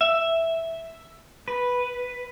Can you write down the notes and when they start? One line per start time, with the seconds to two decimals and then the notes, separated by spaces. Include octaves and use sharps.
0.01 E5
1.48 B4